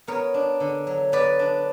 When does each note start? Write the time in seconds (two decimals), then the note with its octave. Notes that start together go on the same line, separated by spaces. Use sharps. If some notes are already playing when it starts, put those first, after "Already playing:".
0.07 B3 A#4 C#5
0.34 D4
0.60 D3
0.87 F#3
1.12 B3 B4 D5
1.39 D4